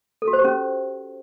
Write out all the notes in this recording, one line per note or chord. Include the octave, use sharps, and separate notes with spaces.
A4
F#4
C5
G4
C#4